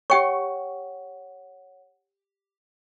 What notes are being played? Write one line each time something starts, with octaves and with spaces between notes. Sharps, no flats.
G4 C#5 F#5 G5 C#6